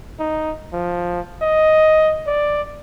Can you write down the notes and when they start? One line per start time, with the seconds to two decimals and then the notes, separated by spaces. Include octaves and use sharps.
0.19 D#4
0.73 F3
1.42 D#5
2.27 D5